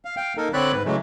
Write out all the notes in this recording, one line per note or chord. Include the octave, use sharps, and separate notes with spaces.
F5
F5 G5
A#3 D#4 A4 A#4
D3 C4 C#5 D5 B5 F#6
G#2 B4
C#3 E3 F#3 G#3 A3